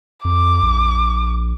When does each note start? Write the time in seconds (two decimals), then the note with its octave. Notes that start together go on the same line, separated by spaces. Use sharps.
0.25 F2 D6
0.63 A#1